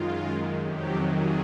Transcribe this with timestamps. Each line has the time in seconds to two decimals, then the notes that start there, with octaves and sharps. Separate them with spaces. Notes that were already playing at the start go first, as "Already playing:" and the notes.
Already playing: F#2 D#3 G#3 F4
0.62 F2 C3 D#3 F#3 G4
1.10 G#4